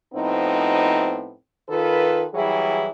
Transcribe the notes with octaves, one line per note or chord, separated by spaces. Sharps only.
A2 F3 B3 C4 D#4
D#3 F4 A4 B4
E3 F#3 G3 E4 G#4